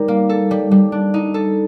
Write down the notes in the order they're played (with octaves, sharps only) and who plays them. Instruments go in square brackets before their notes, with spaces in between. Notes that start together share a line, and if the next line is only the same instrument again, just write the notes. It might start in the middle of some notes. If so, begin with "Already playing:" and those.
Already playing: [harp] G3 D#4 A#4
A#3
A4
G3
G3
D4
D#4
A4